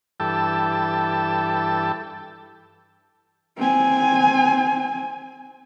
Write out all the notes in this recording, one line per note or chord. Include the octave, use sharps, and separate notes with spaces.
G2 E3 A4 G5 A5 E6
C4 G#5